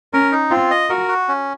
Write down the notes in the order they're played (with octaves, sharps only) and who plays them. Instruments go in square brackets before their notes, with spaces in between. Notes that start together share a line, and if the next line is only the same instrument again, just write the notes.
[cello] C#4 [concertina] A#4
[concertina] D#4
[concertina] C4 [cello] F4
[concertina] D#5
[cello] F#4 [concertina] A#4
[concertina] F#4
C#4